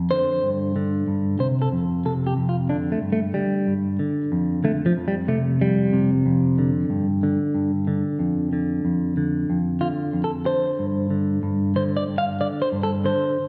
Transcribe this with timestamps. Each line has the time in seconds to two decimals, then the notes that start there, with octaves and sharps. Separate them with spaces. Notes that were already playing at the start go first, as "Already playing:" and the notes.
Already playing: F2
0.11 D3 C5
0.43 G2
0.76 D3
1.08 G2
1.40 C3 C5
1.62 A4
1.72 F2
2.05 C3 A4
2.27 G4
2.37 F2
2.49 F4
2.69 D3 D4
2.92 A3
3.02 G2
3.13 A3
3.34 D3 G3
3.67 G2
3.99 D3
4.32 F2
4.64 D3 A3
4.86 F3
4.97 F2
5.08 G3
5.28 C3 A3
5.61 F2 G3
5.93 C3
6.26 F2
6.58 D3
6.90 G2
7.23 D3
7.55 G2
7.87 D3
8.19 F2
8.53 D3
8.85 F2
9.17 D3
9.50 F2
9.81 D3 F4
10.13 F2
10.24 A4
10.46 D3 C5
10.79 G2
11.10 D3
11.43 G2
11.76 D3 C5
11.97 D5
12.09 G2
12.18 F5
12.41 D3 D5
12.62 C5
12.72 G2
12.83 A4
13.04 D3 C5